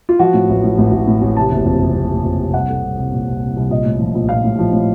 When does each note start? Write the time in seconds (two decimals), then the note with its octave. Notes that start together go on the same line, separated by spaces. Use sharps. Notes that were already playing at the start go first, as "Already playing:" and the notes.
0.09 F4
0.19 F3 F#4
0.34 A2
0.49 A1
0.64 A2
0.78 A1
0.92 A1
1.07 A2
1.22 A1
1.37 C3 A5
1.51 F#1
1.66 F2
1.80 C3
1.95 F#1
2.10 F#1
2.25 F2
2.39 C3
2.53 C2 F#5
2.68 A3
2.83 C2
2.98 C2
3.12 A#2
3.27 C2
3.42 C2
3.56 C2
3.70 A#1 D#5
3.85 A2
4.00 F3
4.15 A#1
4.29 A#1 F5
4.44 A2
4.59 F3
4.73 A2